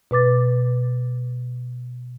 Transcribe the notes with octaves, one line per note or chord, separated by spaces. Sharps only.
B2 B4 D6 A6